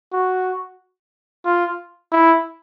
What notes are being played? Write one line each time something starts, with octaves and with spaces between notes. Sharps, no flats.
F#4
F4
E4